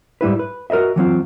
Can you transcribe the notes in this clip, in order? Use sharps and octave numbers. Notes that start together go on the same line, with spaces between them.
G#2 G3 E4 B4
B4
F#4 A#4 B4 D#5 E5
E3 F#3 C4 F4